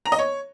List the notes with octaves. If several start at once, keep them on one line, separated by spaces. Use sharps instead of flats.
A#5
D#5
C#5